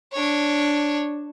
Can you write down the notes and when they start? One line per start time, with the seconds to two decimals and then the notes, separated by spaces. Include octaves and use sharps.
0.12 D4 C#5